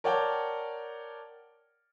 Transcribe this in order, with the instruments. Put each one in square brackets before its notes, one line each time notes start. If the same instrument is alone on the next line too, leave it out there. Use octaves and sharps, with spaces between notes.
[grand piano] A#4 C#5 D5 F#5 G5 A5